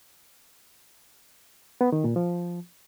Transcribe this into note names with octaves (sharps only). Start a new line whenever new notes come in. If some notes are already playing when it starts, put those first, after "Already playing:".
B3
D#3
A#2
F3